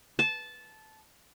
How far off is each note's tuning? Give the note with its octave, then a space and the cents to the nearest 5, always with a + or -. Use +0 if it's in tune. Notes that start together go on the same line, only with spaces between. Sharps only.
A5 -15